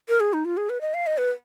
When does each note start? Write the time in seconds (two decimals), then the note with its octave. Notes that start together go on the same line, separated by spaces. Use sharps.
0.09 A#4
0.20 G#4
0.33 D#4
0.45 F4
0.57 G#4
0.70 B4
0.81 D#5
0.94 F5
1.07 D#5
1.18 B4